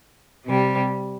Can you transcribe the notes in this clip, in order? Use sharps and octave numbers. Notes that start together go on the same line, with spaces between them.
C3 G3